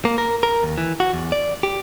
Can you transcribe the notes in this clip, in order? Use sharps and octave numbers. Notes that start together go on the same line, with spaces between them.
A#3
A#4
A#4
D#2
E3
F#4
E2
D5
G4